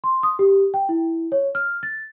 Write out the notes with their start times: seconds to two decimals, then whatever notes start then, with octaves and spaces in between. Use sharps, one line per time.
0.04 C6
0.23 D#6
0.39 G4
0.74 G5
0.89 E4
1.32 C#5
1.55 F6
1.83 A6